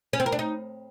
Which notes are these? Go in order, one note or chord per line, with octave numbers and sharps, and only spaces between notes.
C#4
C4
A#4
D4
D#4